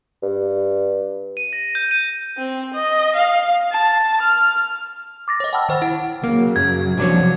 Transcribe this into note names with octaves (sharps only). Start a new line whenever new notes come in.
G2
D#7
A#6
G6
D#7
C4
D#5
F5
A5
F6
D6 A6 A#6
C#5 D#5
F#5 G5 A5 B5 E6 F6
D#3 C5 F6 A6
E4 F#5
C#3 F#3 A#3
F#2 G#6
C2 F3 F#3 D4 C#5